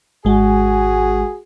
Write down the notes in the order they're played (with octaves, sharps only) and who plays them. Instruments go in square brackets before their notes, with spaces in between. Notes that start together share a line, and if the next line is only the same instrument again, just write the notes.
[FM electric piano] G#1 G#3 [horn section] F#4 G#4 G#5